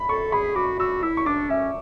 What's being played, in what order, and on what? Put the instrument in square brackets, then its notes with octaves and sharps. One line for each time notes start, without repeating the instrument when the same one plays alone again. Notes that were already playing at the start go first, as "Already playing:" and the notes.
Already playing: [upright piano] B5
[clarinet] A4 [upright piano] C#6
[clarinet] G#4 [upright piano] B5
[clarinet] F#4 [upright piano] D6
[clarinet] F#4 [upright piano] E6
[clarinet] E4 [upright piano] E6
[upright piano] C#6
[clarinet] D4 [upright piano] D6
[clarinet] C#4 [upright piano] E5